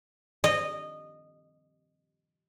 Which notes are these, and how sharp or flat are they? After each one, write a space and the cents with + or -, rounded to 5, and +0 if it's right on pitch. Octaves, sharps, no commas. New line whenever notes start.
D#5 -15